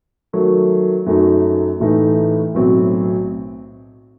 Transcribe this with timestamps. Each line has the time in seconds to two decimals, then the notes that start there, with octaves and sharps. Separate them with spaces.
0.33 D#3 F#3 A3
1.06 F#2 F#3 A3 D#4
1.80 A1 A2 E3 A3 D#4
2.54 B1 A2 F#3 C4